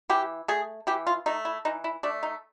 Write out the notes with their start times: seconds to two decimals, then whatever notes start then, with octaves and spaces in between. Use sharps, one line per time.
0.10 E3 G4
0.48 A3 G#4
0.87 E3 G4
1.07 F4
1.26 A3 D#4
1.45 E4
1.65 E3 D#4
1.84 E4
2.03 A3 D4
2.23 D#4